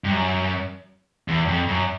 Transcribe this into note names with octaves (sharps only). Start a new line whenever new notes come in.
G2
F#2
E2
F2
F#2